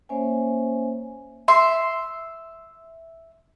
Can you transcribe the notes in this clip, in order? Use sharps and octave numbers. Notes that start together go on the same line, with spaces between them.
A#3 C#4 C5 C#5 E5 G#5
E5 C6